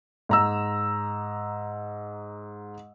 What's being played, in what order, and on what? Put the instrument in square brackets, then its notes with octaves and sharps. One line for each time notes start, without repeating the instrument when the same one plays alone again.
[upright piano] G#2 A#5 E6